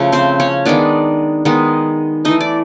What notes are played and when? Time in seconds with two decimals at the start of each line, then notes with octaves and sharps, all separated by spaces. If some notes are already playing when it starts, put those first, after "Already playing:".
Already playing: C#3 F3 A3
0.12 C4 C5
0.40 C#4 C#5
0.65 D#3 G#3 B3 D4 D5
1.45 D#3 G#3 B3
2.25 E3 A3 D#4 D#5
2.41 D5